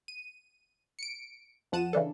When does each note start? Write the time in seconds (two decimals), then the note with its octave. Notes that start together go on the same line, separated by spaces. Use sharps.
0.08 D#7
0.99 C#7 D7
1.72 F2 F3 F#5 A5 D#7 E7
1.93 C#3 E3 D4 A4